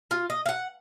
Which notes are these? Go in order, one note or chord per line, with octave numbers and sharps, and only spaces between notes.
F4
D#5
F5 F#5